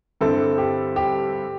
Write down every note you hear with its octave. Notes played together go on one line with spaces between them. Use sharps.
G2 D3 C4 E4 A4
G4
G4